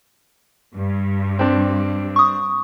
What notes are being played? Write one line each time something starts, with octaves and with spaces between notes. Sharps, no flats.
G2
C4 D4
C#6 D#6